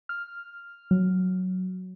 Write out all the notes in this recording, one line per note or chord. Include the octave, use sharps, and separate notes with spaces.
F6
F#3